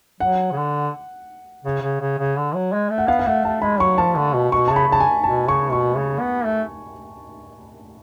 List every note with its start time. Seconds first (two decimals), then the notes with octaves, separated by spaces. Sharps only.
0.20 F#3 F#5
0.52 C#3
0.57 D3
1.64 C#3
1.82 C#3
2.00 C#3
2.18 C#3
2.37 D3
2.55 F#3
2.72 G#3
2.90 A3
2.98 F#5
3.08 B3 F5
3.19 F5
3.26 A3 F#5
3.44 A3 A5
3.62 G#3 B5
3.80 F#3 C#6
3.98 F3 A5
4.17 D3
4.34 B2
4.52 B2 C#6
4.68 C#3 A5
4.76 B5
4.88 C#3 A5
5.00 G#5
5.24 B2 A5
5.47 C#3 C#6
5.72 B2 C#6
5.96 C#3
6.20 B3
6.45 A3